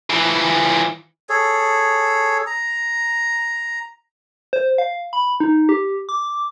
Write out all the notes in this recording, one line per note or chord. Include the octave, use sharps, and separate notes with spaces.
E3 F3
G#4 A4 C#5
A#5
C5
F5
B5
D#4
G4
D6